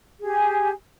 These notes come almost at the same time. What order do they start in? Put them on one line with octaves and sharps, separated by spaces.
G#4 G4 G#5